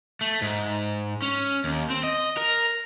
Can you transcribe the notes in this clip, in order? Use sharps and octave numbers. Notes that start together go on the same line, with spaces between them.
A3
G#2
C#4
D#2
C4
D#5
A#4